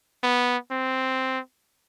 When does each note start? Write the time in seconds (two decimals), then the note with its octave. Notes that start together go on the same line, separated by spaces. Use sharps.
0.23 B3
0.71 C4